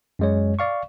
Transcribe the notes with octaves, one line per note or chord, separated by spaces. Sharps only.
F#2 G#3 C#5
D5 F5 C#6